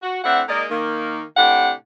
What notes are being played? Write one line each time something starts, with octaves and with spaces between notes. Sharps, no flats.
F#4
A2 C4 D4 E5 F#5
G#3 A#3 D#4 A#4 D5 D#5
D#3 A#3
A2 C3 D4 G4 F#5